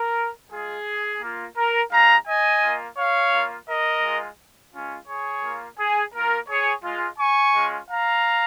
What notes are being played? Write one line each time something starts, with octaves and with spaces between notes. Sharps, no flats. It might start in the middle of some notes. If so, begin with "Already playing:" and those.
Already playing: A#4
G#3 F4 G#4
A#3 F4
A#4
G#3 D#4 F5 A#5
D#5 G#5
A#3 F4
C#5 F5
A#3 F4
A#4 D#5
G#3 F4
G#3 C#4 F4
G#4 C#5
A#3 F4
G#4
A#3 F4 A#4
G#4 C#5
G#3 F4
G#5 C#6
G#3 C#4 F4
F5 A#5